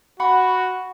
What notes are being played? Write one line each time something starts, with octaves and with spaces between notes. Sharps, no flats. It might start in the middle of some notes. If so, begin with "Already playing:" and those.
F#4 F#5 B5 C#6